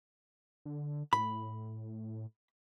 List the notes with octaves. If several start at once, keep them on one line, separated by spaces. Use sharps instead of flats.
D3
A2 B5